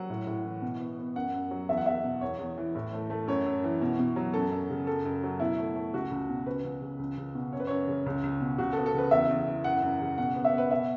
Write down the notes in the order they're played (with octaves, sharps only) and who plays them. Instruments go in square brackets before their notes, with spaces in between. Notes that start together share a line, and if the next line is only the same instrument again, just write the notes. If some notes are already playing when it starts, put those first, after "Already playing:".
Already playing: [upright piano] F#3 F#5
A2
A2
E3
B2
B3
B3
F#2 F#5
F#2
F#3
E2 E5
F#5
E2 E5
B2
E2 C#5
E2
E3
A2
A3
A3
F#2 C#5
F#2
E3
B2
B2
F#3
F#2 A4
F#2
C#3
F#2 A4
F#2
F#3
B2 E4
A3
A3
C#2 F#4
C#2
B2
C#2 B4
C#2
C#3
C#2
C#2
B2
F#2 C#5
B4
F#2 C#5
C#3
C#2
C#2
B2
C#2 F#4
A4
B3
A4
C#3 B4
E2 E5
E2
E3
F#2 F#5
F#2
C#3
B2 F#5
B3
E5
B3
B4
B2 E5